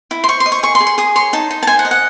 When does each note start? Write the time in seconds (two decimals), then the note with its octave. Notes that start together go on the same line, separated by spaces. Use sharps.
0.11 E4
0.24 C6
0.29 C5 C#6
0.40 C6
0.46 D#5
0.52 C#6
0.63 G#4 C#6
0.75 C6
0.80 G#4
0.87 C6
0.98 G#4 D#6
1.16 C#5 C6
1.33 D#4 A5
1.51 D#4
1.63 A5
1.67 C5 G#5
1.79 F#5
1.85 D#5
1.91 F#5